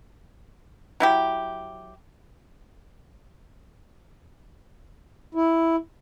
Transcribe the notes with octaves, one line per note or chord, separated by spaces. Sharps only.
F#3 E4 G4
E4